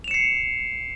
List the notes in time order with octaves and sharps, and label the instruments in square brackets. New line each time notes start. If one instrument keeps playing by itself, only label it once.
[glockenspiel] F7
E7
C#7
C7